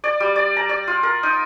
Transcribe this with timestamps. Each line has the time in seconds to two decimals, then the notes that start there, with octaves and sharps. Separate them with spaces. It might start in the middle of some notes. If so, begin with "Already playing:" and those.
0.04 D5
0.20 G3
0.36 D5
0.57 A#5
0.69 D5
0.88 F4
1.03 A#4
1.23 D#4